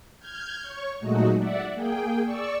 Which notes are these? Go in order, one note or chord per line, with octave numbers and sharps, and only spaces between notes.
F6 G6 G#6
C#5 C#6
A#2 F#3 G#3 A3 D#4 F#4
D5 E5 F#5
A#3 G#4 G5
D5 C#6 E6